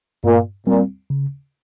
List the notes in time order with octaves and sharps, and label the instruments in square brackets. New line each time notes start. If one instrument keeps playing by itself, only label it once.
[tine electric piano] G2 [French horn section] A#2
[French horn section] A#2 [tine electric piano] G3 C4
[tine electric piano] C#3